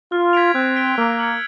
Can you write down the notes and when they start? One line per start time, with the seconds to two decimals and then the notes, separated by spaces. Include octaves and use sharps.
0.12 F4 F6
0.33 G#6 B6 D7 F7
0.55 C4 F#6
0.76 B6 D7 G7
0.97 A#3 E6
1.19 G#6 C#7 F#7